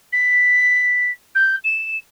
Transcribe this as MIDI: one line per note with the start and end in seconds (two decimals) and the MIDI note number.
0.13 1.10 95
1.35 1.56 91
1.64 1.97 100